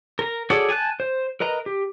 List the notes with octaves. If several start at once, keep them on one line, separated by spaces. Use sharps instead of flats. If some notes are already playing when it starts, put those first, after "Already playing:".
A#4 A#5
F#4 G#4 A4 C#5 D5
G#4 G#5 A5 F#6
C5
A#4 B4 D#5 A#5
G4